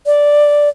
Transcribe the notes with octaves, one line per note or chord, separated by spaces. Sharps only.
D5